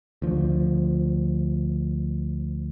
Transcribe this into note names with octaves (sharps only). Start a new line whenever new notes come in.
D2 F3